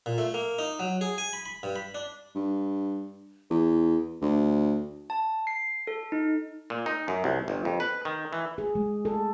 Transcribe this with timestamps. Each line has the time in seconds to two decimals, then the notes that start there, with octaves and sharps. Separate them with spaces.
0.06 A#2
0.18 A3
0.34 A#3
0.59 D#4
0.79 F#3
1.01 G#4
1.18 G#5
1.33 B5
1.46 B5
1.63 G2
1.76 B5
1.95 D4
2.35 G2
3.50 E2
4.21 D2
5.10 A5
5.47 C7
5.87 A4
6.12 D#4
6.70 A#2
6.86 D#4
7.08 F#2
7.24 C2
7.48 G1
7.65 F2
7.80 B4
8.05 D#3
8.33 E3
8.58 G#4
8.75 G#3
9.05 A4